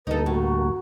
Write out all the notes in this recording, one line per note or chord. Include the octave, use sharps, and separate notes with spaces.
D2 G2 A#3 D#4 A4 B4
A2 F#4